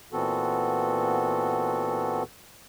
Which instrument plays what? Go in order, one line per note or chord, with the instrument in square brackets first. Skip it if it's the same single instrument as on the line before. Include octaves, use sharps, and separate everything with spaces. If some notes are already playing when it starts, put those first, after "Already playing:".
[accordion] A#2 E3 B3 C4 F#4 A4